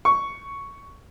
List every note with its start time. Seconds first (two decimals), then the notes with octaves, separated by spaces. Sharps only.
0.05 C#6